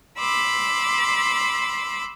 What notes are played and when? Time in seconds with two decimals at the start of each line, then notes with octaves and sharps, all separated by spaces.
0.19 B5 C6 D6 E6